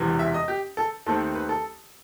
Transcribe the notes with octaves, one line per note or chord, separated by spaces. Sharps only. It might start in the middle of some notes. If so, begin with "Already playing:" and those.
Already playing: E1 E2 C3 E3
E5
D#5
G4
A4
D#2 D#3 A3 C4 A4
B4
A4